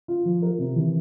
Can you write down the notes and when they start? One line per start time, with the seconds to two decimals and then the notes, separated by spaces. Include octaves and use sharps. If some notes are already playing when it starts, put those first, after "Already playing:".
0.08 F4
0.25 F3
0.42 A#4
0.59 C3
0.76 E3